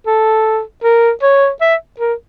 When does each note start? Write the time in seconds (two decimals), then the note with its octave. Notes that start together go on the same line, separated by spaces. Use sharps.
0.07 A4
0.84 A#4
1.22 C#5
1.61 E5
2.00 A#4